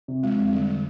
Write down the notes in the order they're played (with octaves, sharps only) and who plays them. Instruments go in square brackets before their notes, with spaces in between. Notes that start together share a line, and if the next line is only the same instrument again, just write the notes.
[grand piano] C3
[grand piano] F3 [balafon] G#3
[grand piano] F2
[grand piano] D3 [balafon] G3